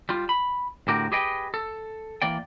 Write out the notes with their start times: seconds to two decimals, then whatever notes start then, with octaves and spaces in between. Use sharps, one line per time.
0.09 G3 F4
0.29 B5
0.88 A2 D3 F#4 G4 A#4
1.12 G4 G#4 B4 D#5 G5
1.54 A4
2.22 E3 A#3 D5 G5